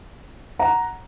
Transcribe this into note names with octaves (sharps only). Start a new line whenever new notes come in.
F#5 A#5